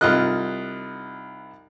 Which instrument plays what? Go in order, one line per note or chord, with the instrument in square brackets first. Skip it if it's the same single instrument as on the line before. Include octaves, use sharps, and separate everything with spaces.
[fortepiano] C2 D#4 F4 D#5 F#6